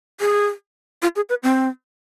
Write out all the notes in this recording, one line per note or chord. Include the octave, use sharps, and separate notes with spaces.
G#4
F4
G#4
B4
C4